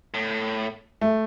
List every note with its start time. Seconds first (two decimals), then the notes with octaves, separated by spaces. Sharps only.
0.14 A2
1.01 A3